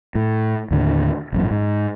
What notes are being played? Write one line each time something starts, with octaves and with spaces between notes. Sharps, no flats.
A2
D#2 A2 D3
A1 F#2 A#2
G#2